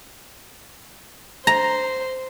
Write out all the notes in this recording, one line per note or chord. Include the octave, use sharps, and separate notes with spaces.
C5 A#5